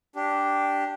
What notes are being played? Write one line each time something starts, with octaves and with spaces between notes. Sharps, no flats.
D4 G4